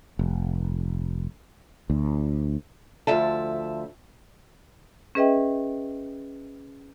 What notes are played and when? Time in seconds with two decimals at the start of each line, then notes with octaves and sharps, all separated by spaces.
0.19 F1
1.90 D2
3.07 D2 F3 E5 A5
5.15 C#4 G#4 B4 D#5 E5 G5